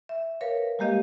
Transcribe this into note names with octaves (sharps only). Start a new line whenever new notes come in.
E5
A#4 B4 C#5 F5
G3 G#3 A#3 G4 D#5 F5